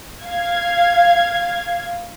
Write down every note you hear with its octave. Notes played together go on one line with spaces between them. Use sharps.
F5 G#6